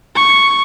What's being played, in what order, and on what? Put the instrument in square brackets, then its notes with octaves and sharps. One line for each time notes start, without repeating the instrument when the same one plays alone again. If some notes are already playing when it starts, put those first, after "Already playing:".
[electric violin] C#6